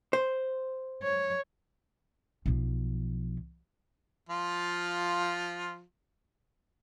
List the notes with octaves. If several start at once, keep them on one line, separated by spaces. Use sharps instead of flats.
C5
C#5
B1 F3
F3 F4